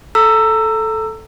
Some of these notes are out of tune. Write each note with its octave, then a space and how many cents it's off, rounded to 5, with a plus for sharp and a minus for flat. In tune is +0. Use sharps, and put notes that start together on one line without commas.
A4 -5 A#5 -20 E6 +15